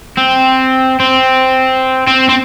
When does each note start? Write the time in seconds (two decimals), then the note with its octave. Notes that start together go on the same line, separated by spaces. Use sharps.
0.18 C4
1.00 C4
2.07 C4
2.29 C4